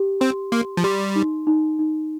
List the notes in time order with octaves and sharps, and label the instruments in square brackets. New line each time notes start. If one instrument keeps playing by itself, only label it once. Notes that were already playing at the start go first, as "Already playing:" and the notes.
Already playing: [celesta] G4
[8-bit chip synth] C4 [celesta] C6
[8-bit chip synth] A#3 [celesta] C6
[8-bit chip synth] F3
[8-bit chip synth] G3 [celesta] C6
[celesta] D#4
D#4
D#4